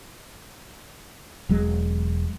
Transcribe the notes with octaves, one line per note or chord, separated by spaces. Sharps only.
E1 F#3 G#3